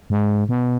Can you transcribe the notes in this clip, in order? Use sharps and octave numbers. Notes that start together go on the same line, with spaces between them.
G#2
B2